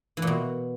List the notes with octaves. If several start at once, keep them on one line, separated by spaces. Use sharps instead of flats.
E3
A#2
B2